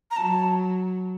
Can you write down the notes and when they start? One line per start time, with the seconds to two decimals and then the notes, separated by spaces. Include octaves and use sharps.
0.11 A#5
0.17 F#3 A5